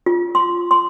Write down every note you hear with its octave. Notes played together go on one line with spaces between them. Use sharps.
F4
C6
C6